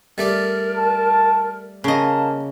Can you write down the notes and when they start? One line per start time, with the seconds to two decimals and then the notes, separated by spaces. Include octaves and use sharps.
0.18 G3 A3 A#4 D5
0.76 A5
1.84 C#3 A#3 D#5 A5